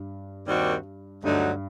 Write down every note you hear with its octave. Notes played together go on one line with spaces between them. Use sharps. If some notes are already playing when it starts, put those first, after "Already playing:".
Already playing: G2
D#2 D#3 G3 C4 F#4
D2 G2 D3 F#3 A3 D#4